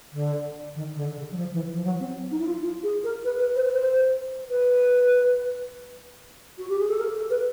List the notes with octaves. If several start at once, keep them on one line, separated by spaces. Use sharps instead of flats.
D3
D#3
D3
C#3
F#3
F3
E3
F3
F#3
C4
D#4
E4
F4
F4
G#4
A#4
B4
B4
C5
B4
C5
B4
F#4
G4
G#4
A4
A#4
A4
B4